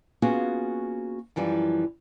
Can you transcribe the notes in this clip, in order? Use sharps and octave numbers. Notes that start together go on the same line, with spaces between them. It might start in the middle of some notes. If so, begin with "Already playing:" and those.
A#3 B3 C#4 F4 F#4 G#4
F#2 E3 F3 G3